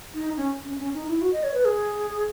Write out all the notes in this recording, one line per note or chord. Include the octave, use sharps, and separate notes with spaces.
D#4
C#4
C#4
C#4
D#4
E4
F#4
D#5
C#5
B4
G#4